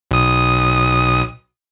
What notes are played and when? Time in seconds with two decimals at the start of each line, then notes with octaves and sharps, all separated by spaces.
0.11 B1 D#6